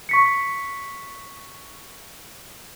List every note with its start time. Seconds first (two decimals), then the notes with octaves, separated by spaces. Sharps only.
0.09 C#6 B6 C#7